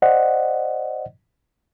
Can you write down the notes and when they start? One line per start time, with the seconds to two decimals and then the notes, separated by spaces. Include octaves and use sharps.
0.02 C5 D5 D#5 F#5